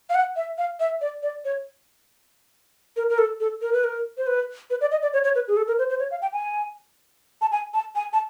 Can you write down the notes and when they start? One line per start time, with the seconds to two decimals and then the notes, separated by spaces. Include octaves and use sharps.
0.10 F5
0.15 F#5
0.36 E5
0.58 F5
0.80 E5
1.01 D5
1.23 D5
1.45 C#5
2.96 A#4
3.09 A#4
3.18 A4
3.40 A4
3.62 A#4
3.73 B4
3.84 A#4
4.17 C5
4.27 B4
4.70 B4
4.81 D5
4.92 D#5
5.02 D5
5.13 C#5
5.24 C#5
5.35 B4
5.48 G#4
5.57 A4
5.68 A#4
5.79 C5
5.90 C5
6.00 C#5
6.11 F5
6.22 G5
6.33 G#5
7.41 A5
7.52 G#5
7.74 A5
7.95 G#5
8.13 A5